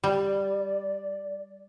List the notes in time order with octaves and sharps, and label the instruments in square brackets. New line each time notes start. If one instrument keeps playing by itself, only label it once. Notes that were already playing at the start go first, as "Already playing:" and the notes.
[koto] G3 [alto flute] D5